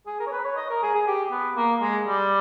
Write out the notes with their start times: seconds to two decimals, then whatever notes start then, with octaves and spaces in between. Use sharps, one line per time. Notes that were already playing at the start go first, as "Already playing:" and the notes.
0.07 G#4
0.20 A#4
0.26 C#5
0.32 B4
0.44 C#5
0.56 D#5
0.70 A#4
0.82 G#4
0.95 G#4
1.07 G4
1.31 B3
1.56 A#3
1.81 G#3
2.07 G3